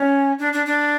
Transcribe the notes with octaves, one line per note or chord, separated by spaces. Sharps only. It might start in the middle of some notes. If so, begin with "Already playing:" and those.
Already playing: C#4
D4
D4
D4